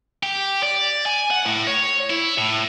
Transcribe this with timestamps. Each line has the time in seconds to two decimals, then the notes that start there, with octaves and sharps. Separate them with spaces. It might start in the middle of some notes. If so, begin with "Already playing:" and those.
0.23 G4
0.63 D5
1.06 G#5
1.30 F#5
1.46 A2
1.67 C#5
2.10 E4
2.38 A2